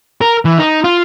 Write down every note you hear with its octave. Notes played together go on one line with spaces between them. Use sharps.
A#4
E3
D#4
F4